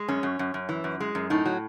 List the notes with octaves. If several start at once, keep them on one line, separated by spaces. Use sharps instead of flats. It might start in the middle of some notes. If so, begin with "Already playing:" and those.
Already playing: G#3
F#2 C#4
F#2
F#2
F#2
E3
F#2
G#3
F#2
A2 D#4
F#3